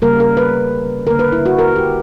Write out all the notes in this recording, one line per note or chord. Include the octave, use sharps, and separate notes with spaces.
C#3 G3 A#3 A#4
A#4
B4
D3 A#3 A#4
B4
E4
F#4
A#4
G4